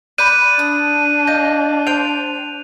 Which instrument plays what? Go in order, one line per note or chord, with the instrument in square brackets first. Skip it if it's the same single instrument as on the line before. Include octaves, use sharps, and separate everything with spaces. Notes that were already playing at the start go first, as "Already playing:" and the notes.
[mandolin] D5 B5 [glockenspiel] F#6 G6 [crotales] D#7
[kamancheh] D4 [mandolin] D#6
[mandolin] A#3 D#5 F6 [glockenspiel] G6
[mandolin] C5 G5 G6 [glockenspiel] F7